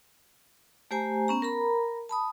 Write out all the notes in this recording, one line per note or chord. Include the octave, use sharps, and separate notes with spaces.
A3 G4 C5 G#5 A#5
B3 C#4 A#5
A#4 A#5 B5
A5 B5 D#6